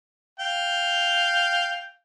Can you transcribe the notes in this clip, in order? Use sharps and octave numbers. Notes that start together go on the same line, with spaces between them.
F5 G5